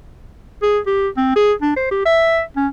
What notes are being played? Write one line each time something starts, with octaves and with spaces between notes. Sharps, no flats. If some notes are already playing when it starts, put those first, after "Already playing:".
G#4
G4
C4
G#4
D4
C5
G4
E5
C#4